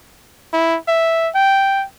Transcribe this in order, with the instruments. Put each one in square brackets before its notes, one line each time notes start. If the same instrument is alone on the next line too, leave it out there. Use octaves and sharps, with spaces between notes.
[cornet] E4
E5
G5